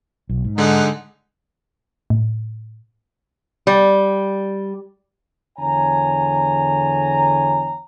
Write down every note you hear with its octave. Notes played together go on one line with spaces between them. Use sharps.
B1
G#2
D3 G#3 D#4 F#5
A2
G3
E2 D3 C#5 G#5 A#5